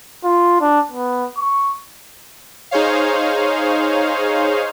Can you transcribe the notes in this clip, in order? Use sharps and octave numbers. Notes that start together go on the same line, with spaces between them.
F4
D4
B3
C#6
D#4 G#4 C5 C#5 F5